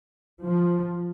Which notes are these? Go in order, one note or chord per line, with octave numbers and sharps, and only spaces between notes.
F3